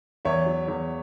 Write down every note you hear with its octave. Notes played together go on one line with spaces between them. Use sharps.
E2 C#5 E5
F#3
E2